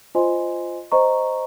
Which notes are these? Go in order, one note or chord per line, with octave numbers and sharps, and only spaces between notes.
F4 C5 D#5 G#5 C6
C5 D#5 A#5 C#6